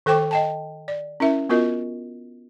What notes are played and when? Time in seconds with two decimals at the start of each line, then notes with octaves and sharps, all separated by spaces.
0.06 D#3 A4 C5 G5 C#6 D6
0.31 D#5 G5 A5
0.88 D5
1.20 C#4 E4 A#4 E5
1.49 B3 F4 F#4 A#4 D#5